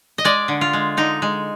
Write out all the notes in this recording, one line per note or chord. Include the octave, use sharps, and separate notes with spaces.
D#5
G#3 D5
D3
F4
G#3
D3 D#4
G#3